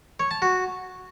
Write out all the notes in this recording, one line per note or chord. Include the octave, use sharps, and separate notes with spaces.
C#5
A5
F#4